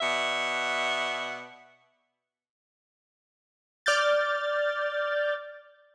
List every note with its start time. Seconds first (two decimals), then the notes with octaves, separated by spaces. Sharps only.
0.01 B2 D5 E5 F#5
3.86 D5 F6 G6 A6